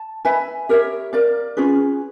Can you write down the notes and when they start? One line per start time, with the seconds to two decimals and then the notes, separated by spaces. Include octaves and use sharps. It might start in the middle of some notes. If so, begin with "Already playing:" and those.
Already playing: A5
0.25 B4 E5 G#5 B5
0.69 G4 A#4 C#5 E5
1.13 A#4 D5 F5
1.57 C#4 F4 G#4 B4